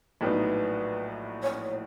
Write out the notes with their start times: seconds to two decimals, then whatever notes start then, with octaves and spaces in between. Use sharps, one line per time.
0.21 A#1 A2 F#3 B3 D#4 B4
1.43 C#5